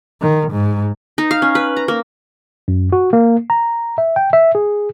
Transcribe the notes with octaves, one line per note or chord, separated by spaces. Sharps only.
D#3
G#2
D#4
F5
C#4
B4
A#5
A#3
F#2
F#4
A#3
A#5
E5
G5
E5
G#4